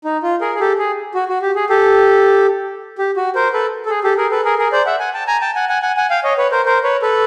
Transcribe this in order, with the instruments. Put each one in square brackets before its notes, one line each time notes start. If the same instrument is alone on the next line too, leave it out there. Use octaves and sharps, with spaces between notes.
[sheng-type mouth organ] D#4
F4
G#4 A#4
G#4
G4 A4
G#4
F#4
F#4
G4
G#4
G4 A4
G4
F#4
A#4 C5
A4 B4
A4
G#4
G4 A4
G#4 A#4
A4 B4
G#4 A#4
G#4 A#4
C5 D5
E5 F#5
F#5 G#5
G5 A5
G#5 A#5
G5 A5
F#5 G#5
F#5 G#5
F#5 G#5
F#5 G#5
F5 G5
C#5 D#5
B4 C#5
A#4 C5
A#4 C5
B4 C#5
A4 B4